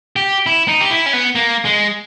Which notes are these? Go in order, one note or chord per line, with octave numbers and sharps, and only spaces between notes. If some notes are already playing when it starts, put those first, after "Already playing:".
G4
E4
D#4
G4
E4
C#4
B3
A#3
G#3